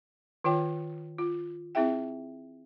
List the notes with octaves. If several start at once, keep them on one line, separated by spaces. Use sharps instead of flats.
D#3 F4 C#5 G5
F4
C4 E4 G#4 E5 G5